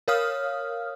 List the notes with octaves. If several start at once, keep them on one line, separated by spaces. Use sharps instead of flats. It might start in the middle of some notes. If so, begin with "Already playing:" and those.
A#4 C#5 F5 D#6 F6